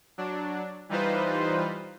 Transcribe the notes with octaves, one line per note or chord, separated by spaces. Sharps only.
F#3 D4
E3 G3 D#4 F4 B4 C5